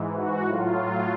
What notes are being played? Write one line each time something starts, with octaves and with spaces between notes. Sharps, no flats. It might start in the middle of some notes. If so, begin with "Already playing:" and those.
Already playing: G#2 E3
F#4
A2 F#3 F4